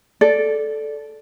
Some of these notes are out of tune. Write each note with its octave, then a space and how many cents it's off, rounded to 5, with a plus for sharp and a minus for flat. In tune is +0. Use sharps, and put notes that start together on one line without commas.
A4 -10 D5 +0